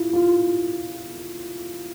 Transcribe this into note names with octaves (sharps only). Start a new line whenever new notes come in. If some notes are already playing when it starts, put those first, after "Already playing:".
Already playing: E4 F4
F4